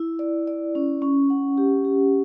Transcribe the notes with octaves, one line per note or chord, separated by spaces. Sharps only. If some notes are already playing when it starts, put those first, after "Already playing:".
Already playing: E4
D5
D5
C#4
C#4
F#5
G4
G4